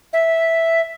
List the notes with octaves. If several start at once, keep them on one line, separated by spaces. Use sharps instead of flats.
E5